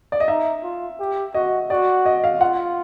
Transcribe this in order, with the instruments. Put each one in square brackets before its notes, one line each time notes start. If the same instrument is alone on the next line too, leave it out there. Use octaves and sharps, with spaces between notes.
[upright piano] D5
D#5
[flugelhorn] D#4 [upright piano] E5
[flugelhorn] F4
G4
[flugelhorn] F#4 [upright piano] D#5
[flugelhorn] F#4 [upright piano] D5
[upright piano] D#5
F5
[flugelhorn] F4 [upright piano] F#5